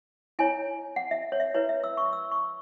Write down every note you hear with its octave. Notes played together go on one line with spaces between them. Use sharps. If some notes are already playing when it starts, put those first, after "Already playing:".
E4 C#5 G#5
F#5
E5
C#5
E5
E4 B4 C#5
E5
E6
C#6
E6
C#6